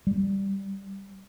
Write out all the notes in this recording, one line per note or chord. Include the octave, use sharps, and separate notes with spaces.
G3